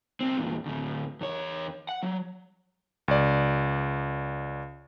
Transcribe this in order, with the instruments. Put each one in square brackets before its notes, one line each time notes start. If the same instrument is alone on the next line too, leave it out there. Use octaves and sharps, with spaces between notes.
[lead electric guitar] C2 C4
E2 A#2
D2 A2
E2 C#5
F#5
F#3
[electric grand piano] C#2 D5